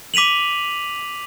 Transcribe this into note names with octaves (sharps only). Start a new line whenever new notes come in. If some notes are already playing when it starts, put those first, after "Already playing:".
D6 B6 D#7 F7 F#7